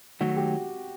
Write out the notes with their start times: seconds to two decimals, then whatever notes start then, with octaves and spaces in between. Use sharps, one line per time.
0.20 D#3 F#3 A3 F#4
0.36 G4